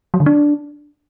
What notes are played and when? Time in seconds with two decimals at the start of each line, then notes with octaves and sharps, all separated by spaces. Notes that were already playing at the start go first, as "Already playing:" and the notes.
0.14 F#3
0.20 D3
0.26 D4